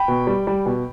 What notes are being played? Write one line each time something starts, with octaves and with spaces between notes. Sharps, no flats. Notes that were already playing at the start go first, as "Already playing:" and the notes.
Already playing: G5 B5
B2
G3
G3
B2